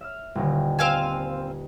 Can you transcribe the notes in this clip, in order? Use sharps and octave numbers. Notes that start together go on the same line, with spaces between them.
E5 E6 F6
D#1 D3 D#3
C4 F5 G#5